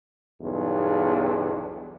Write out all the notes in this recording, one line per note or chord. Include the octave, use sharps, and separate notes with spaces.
B1 E2 G2 C#3